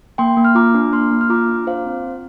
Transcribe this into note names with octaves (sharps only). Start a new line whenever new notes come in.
A#3 G5 C6
A#3
F6
F4 A#5 D6
D4
A#3 C6 F6
A#3
F6
F4 A#5 D6
D4
F4 C5 F5
C4
C4